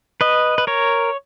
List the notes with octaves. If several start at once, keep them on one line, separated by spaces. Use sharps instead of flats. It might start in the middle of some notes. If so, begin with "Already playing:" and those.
B4 D#5
B4
A#4 C#5